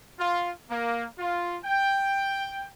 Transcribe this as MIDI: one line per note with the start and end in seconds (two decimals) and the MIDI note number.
0.19 0.51 65
0.71 1.06 58
1.18 1.57 65
1.64 2.69 79